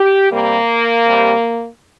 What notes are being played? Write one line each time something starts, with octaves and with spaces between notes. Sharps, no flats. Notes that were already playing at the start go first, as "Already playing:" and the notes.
Already playing: G4
C3 G3 A#3
C3 G3